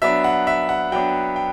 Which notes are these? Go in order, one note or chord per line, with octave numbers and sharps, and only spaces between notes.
F#3 B3 D4 E5
F#5
E5
F#5
F#3 B3 D4 G5
G5